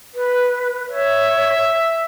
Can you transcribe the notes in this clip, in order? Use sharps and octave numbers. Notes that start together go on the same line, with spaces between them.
B4
C#5 E5